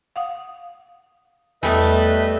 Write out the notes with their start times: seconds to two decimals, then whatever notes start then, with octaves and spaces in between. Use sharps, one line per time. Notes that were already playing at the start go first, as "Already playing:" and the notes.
0.16 F5 F#5 D#6
1.63 E2 G3 A3 B3 B4 D#5 E5 D#6